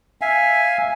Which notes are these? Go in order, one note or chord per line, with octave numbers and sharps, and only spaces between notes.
E5 F5 G#5